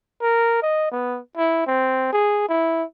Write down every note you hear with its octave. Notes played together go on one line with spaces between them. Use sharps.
A#4
D#5
B3
E4
C4
G#4
E4